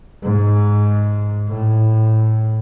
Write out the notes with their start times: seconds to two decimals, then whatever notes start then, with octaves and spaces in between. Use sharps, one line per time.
0.23 G#2
1.49 A2